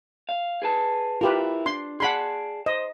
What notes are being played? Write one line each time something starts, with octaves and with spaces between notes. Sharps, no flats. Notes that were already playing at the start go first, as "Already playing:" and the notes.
F5
G#4 B4 A5
E4 F4 G4 A#4 B4
D4 C6
G#4 D5 F#5 A5 B5 C6
C5 D#5